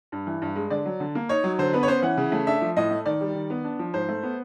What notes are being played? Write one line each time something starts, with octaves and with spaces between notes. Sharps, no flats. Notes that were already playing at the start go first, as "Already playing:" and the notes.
G2
E3
G2
G#3
D3 D5
F#3
D3
A#3
D#4 C#5
F#3
D3 C5
B3 B4
C#5
C#4 C5
E3 F#5
C#3
A3
D4 E5
F3
A2 D#5
A3
D#3 D5
G3
D#3
B3
D4
F3
G#2 C5
A3
B3